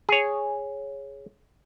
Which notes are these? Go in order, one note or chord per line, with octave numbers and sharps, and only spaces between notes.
G#4 C#5